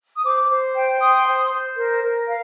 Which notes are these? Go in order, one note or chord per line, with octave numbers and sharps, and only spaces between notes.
D#6
C5 D6
C5
G5
C6 D#6
C5
C5
A#4
A#4
F5